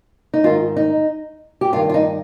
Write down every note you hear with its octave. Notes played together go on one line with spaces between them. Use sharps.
D#4
G#2 D#3 F4
D#4
G4
G2 D#3 F4
F4
D#4